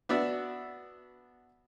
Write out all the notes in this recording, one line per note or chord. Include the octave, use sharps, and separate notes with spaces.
B3 D4 F#4 E5